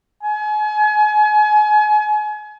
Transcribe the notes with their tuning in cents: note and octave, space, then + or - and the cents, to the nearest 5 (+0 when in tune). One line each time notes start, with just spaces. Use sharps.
G#5 +35